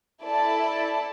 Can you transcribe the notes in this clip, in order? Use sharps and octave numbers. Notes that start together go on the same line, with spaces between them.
E4 A4 D5 A5